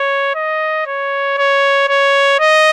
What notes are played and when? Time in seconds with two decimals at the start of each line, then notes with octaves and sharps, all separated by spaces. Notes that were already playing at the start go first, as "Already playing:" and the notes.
Already playing: C#5
0.35 D#5
0.86 C#5
1.38 C#5
1.88 C#5
2.40 D#5